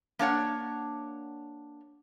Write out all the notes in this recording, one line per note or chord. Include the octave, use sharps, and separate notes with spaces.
A#3 D4 C#5 F#5